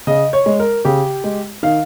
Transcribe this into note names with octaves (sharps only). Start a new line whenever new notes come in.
C#3 D#5
C#5
G#3
A#4
C#3 G4
G#3
D#3 F5